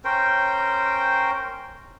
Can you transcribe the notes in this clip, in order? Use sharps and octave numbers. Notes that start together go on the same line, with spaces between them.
C#4 A#4 C5 G5